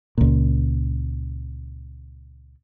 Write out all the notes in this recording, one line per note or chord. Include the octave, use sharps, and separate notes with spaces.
C#2 A#2